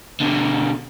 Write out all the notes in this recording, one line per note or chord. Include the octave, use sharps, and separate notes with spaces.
B2 D3